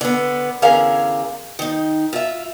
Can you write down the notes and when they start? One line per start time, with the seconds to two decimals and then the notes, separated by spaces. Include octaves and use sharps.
0.01 D3 B3
0.62 E2 D3 C#4 G#4 A#4 F5
1.59 D#3 D#4
2.13 F4 E5